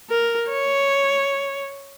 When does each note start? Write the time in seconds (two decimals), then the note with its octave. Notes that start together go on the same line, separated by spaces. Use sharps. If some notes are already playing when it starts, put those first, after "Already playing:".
0.10 A#4
0.49 C#5